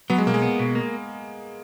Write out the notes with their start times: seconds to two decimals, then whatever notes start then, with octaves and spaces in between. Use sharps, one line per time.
0.10 F#3 B3
0.18 G#3
0.26 B1 A#3
0.34 G#3
0.42 B3
0.59 B2
0.75 A#3